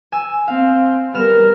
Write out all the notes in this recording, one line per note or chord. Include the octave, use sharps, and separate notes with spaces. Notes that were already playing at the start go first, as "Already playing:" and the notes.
G#5 E6
C4 F5
G3 B3 A#4 F6 E7